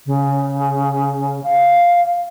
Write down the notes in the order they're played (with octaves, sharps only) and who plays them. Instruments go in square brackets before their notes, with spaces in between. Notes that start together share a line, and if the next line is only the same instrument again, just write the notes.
[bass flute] C#3
F5